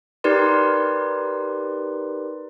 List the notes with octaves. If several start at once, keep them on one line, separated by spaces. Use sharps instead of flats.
D#4 G4 A#4 B4 D5 C6